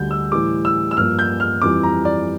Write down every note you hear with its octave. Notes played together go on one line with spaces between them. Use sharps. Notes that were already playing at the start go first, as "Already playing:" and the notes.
Already playing: D2 D3 G3 G6
E6
A2 E3 G3 D6
E6
E6
G2 F3 A#3 F6
G6
F6
F2 E3 G3 D6
A#5
D5